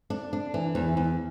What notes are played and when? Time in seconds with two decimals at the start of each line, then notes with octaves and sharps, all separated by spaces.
0.10 D4
0.33 D4
0.54 E3
0.75 E2
0.97 E2